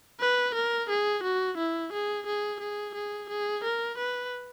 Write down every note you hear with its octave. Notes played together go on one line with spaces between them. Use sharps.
B4
A#4
G#4
F#4
E4
G#4
G#4
G#4
G#4
G#4
A#4
B4